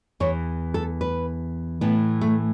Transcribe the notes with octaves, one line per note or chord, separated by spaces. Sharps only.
E2 E3 C#5
A4
B4
A2 E3 B3
A3